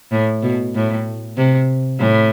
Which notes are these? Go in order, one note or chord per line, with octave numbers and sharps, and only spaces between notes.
A2
B2
A2
C3
A2